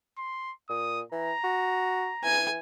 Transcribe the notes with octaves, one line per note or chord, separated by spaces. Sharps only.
C6
A#2 D#6
E3 A#5
F#4
E3 G#5